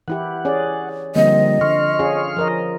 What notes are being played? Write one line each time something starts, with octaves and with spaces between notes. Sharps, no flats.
E3 E4 G4 F#5
C#4 G#4 D5
D3 F3 G3 A#3 C4 D#5
D3 C6 C#6 F6
C#4 F4 G#4
F3 A#4 D#5